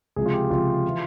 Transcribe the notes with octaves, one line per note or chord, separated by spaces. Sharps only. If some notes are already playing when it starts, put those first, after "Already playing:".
C#2 C3 F3 G#4
F4
G4
C#2 C3 F3 F4
E3